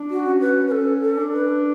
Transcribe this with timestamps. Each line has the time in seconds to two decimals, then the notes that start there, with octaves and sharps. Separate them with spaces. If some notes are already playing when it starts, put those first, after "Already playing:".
Already playing: D4
0.10 F#4
0.26 C#4
0.41 B4
0.67 B4
0.72 C#4 A4
1.02 A4
1.17 D4
1.33 B4